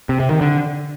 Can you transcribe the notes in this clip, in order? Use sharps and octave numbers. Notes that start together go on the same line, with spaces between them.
C3
C3
D#3
D3